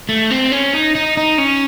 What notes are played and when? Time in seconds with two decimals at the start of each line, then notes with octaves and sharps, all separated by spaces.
0.09 A3
0.31 C4
0.52 C#4
0.74 D#4
0.95 D#4
1.17 D#4
1.38 C#4